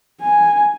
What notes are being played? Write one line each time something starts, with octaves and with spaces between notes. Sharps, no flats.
G#5